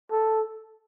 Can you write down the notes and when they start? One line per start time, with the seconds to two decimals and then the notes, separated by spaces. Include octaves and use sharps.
0.11 A4